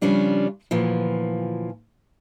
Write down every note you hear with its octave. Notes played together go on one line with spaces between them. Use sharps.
C#3 F3 G3 C#4 D4 F4
D2 A#2 E3 F3